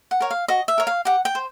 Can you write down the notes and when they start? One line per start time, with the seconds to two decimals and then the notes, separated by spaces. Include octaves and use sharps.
0.11 F#5
0.20 A#4 C#5
0.31 F5
0.48 F#4 D#5
0.68 E5
0.78 A#4 C#5
0.87 F5
1.05 G4 F#5
1.25 G5
1.35 C5